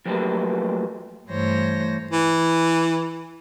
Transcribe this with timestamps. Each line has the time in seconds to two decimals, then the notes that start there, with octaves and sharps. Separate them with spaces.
0.06 F3 F#3 A3 A#3 G4 B4
1.28 G2 E3 A3 C5 C#5 A#6
2.11 E3